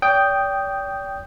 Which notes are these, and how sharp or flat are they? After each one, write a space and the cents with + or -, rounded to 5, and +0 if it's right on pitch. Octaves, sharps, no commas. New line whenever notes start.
D5 -45 G5 +0 D#6 -5